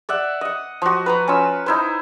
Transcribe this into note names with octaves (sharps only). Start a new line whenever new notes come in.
D5 E5 F#5
D#5 F#5
F3 F#4
B4 A#5 C6
C#4 F4 E6
D#4 E4 C5